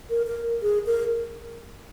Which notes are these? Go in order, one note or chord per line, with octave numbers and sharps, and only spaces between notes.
A#4
A#4
G#4
A#4